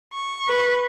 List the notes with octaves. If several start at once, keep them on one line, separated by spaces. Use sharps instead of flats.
C#6
B4